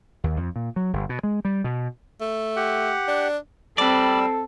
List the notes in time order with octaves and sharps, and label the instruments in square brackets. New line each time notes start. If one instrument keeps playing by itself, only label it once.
[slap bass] D#2
F2
A#2
F#3
G1
B2
G#3
G3
B2
[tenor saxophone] A3
[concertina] G4 F#5
[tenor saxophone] D4
[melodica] G3 E6 [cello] C4 [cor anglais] A4 [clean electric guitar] B4 D5